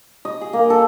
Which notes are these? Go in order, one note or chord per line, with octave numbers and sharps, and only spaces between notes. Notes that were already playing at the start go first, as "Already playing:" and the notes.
D#5
G#4
A#3
A4